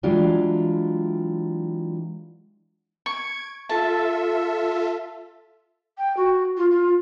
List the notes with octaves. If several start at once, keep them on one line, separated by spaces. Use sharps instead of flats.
E3 F#3 G#3 D4 F4 G4
C#6 G#6 D7
F4 A4 E5 A5
G5
F#4
F4
F4